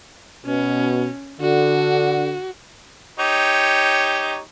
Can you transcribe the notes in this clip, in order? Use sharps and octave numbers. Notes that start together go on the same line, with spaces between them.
B2 C#4
D3 F#4
D#4 G4 C#5